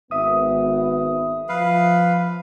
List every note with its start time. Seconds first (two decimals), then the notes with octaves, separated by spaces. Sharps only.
0.11 G#1 B3 E5 D#6
1.49 F3 B4 F5